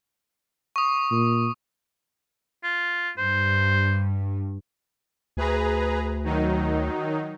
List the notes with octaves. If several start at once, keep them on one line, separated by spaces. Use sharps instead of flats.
C#6 D#6
A#2
F4
G2 C5
D2 G#4 B4 A#5
D#3 F#3 D#4